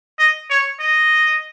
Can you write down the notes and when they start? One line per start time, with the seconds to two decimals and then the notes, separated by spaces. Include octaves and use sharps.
0.19 D#5
0.50 C#5
0.80 D#5